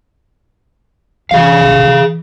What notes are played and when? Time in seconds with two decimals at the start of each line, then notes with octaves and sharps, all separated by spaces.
1.31 E3 G#4 F5
1.61 A1 B2
1.82 E3